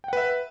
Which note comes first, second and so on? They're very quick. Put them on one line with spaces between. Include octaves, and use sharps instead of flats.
G5 F#5 B4 E5